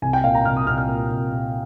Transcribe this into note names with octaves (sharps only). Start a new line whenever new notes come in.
C2 G#5
G5
A#2 F5
A#5
C2 F6
D#6
C2 F6
F6
A#2
C2
A#2